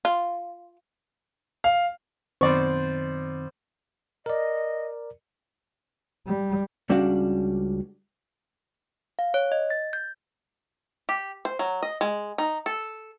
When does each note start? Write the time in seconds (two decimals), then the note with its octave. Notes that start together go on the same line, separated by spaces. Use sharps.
0.05 F4
1.64 F5
2.41 F#2 B2 D#3 C4 C5 D5 C#6
4.26 A#4 D5 D#5
6.27 G3
6.90 C#2 G3 C#4 D4 F#4 F5
9.19 F5
9.34 C#5
9.52 D#5
9.70 A6
9.93 G6
11.09 G4
11.45 C5
11.59 F#3
11.83 D#5
12.01 G#3
12.38 D#4
12.66 A4